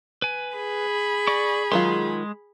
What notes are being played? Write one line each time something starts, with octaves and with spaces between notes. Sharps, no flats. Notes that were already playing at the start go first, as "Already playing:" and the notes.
B4 G#5
G#4 B5
D5 C#6
D#3 F#3 G#3 F4 C6